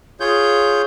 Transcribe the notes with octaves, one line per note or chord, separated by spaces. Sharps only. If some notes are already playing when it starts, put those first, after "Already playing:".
F4 G#4 C#5 G6